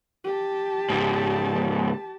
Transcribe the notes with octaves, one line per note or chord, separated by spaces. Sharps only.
G4 A5
C#2 G#2